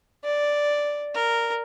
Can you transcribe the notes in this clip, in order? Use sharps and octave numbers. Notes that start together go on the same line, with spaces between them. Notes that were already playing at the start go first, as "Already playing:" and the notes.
D5
A#4